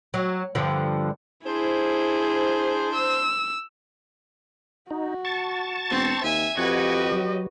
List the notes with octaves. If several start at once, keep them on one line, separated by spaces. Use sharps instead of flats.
F#3
G2 D3 F3
D4 E4 G#4 C5
E6
D#4 F#4
A5 C#6 A6
E1 C4
D#2 E5 G#5
F2 F#4 G4 B4 D#5 F#5 G#6
F#3